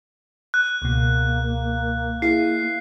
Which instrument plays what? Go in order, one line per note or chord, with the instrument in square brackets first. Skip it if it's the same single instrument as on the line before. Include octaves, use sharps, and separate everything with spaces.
[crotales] F#6
[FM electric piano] C#2 B2 [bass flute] A#3
[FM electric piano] E4 G#4 F5 [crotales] C7